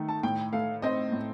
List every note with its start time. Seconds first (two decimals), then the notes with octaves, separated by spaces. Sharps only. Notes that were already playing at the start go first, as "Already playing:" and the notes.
Already playing: D#3 A3
0.09 A5
0.23 A2 G5
0.53 A3 F5
0.82 C4 D#5
1.12 A2